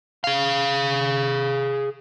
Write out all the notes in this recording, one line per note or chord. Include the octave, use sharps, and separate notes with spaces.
G#4 F5